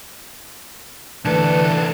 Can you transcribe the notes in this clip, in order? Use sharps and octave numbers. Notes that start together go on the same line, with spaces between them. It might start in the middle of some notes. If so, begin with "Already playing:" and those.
C2 D3 E3 A3 D4 A4 B4